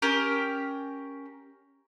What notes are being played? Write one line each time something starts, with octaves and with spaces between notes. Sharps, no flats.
C#4 G4 A#4